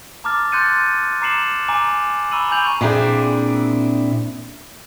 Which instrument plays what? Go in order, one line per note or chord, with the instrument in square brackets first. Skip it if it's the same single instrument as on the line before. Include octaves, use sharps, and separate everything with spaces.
[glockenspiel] A5 A#5 D6 E6 F6 A6
C6 F#6 G6 A6 C#7 D#7
A#5 D6 C7 C#7 E7 F#7
G#5 A#5 D6
A#5 B5 C#6 E6 D#7 F#7
G#5 C#6 G6 F7 F#7
[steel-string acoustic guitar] A#2 C4 D4 E4 G#4